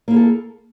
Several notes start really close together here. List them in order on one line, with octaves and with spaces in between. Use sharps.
A#3 E4 G#4 A4